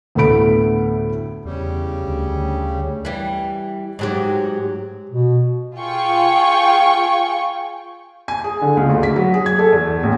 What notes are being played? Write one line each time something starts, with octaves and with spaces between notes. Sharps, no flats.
D2 A2 B3 A4 B5 D7
E2 C#3 G3
D2
E3 G3
G#2 F#3 G4
B2
F4 G#4 G5 C#6
G#5
G#4
D3
C#2
D2
B6
F#3
G#4
G#6
A4
E2
A1